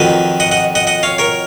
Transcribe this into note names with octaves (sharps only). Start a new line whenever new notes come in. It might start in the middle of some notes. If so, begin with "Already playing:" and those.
Already playing: F2 D#3 F#3 B4 D#5
D#5 F#5
D#5 F#5
D#5 F#5
D#5 F#5
C#5 F5
A#4 C#5